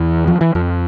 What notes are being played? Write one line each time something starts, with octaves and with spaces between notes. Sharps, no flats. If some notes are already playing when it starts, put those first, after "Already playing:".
Already playing: E2 E3
F3
E3
F2 F3